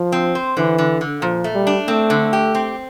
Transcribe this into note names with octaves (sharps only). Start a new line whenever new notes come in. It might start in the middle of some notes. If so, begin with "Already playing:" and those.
Already playing: F3
C4
C5
D3 E3
D3
D3
A#2 F3
A3
G3
D4
A3 C4
D3
G4
C4